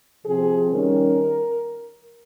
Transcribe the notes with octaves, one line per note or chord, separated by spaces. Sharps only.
C3 F3 C4 G#4
D#3 G3 C#4 A#4